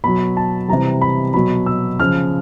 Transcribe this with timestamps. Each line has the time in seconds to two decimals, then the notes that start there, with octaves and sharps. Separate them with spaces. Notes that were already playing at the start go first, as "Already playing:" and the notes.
0.04 B2 F#3 B5
0.37 A5
0.68 C3 E3 G3 A#5
1.02 B5
1.34 B2 F#3 B5
1.66 E6
1.99 C#3 F3 F6